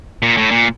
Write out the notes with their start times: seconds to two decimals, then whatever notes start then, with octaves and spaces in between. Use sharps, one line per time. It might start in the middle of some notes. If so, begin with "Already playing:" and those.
0.23 A#2
0.37 A2
0.51 A#2